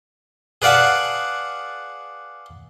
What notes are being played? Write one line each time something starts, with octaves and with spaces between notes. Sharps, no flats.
G#4 B4 D5 F5 F#5 A5